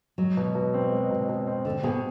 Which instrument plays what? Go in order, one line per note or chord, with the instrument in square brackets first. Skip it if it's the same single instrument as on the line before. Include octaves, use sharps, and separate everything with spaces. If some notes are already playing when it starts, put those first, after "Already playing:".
[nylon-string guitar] F#3 [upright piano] G#3
[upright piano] B2
B2
C4
G#3
B2
B2
C4
[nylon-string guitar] D3 [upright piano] C4
[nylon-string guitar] B2 [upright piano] G#4